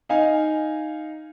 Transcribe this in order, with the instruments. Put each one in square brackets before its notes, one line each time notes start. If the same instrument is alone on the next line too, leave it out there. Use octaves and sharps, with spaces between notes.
[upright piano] D#4 F5 G#5